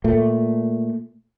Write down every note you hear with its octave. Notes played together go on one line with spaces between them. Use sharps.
A#2 A3